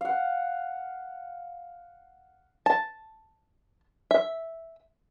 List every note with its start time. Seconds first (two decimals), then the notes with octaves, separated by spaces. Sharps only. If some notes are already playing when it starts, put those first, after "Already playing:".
0.01 F5 F#5
2.66 A5
4.11 E5